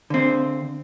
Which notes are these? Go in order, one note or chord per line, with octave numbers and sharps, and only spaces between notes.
D3 C4